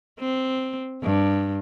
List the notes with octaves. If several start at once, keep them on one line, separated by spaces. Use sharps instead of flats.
C4
G2